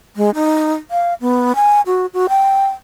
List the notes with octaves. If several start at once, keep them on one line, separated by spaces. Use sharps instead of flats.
G#3
D#4
F5
B3
G#5
F#4
F#4
G5